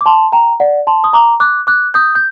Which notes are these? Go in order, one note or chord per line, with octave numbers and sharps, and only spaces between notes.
D6
A5 C6
G5 A#5
D5 F#5
A5 C6
D#6
A#5 D6
D6 F#6
D6 F#6
D#6 G6
G6